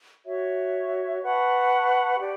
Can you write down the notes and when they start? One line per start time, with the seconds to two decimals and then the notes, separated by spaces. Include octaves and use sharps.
0.24 F#4 C#5 E5
1.22 B4 F#5 A5 C#6
2.19 G4 D5